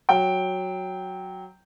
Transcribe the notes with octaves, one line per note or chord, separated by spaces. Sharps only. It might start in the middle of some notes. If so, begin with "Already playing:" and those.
F#3 G5